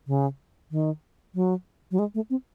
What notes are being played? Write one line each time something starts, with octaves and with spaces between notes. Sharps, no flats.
C#3
D#3
F#3
F#3
G#3
A3
C4